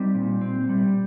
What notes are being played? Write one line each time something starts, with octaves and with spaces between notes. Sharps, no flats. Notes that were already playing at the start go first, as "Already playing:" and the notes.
Already playing: G3 C4 D#4 G4
A#2
C4
G3